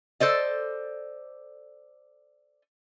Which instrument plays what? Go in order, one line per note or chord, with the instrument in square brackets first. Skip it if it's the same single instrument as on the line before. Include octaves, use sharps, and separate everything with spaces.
[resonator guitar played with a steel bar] A4 C5 D5 D#5